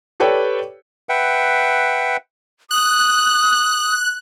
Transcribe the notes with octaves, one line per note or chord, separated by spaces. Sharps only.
G4 A4 B4 C#5 D5 G5
B4 E5 F#5 G5
D#6 F#6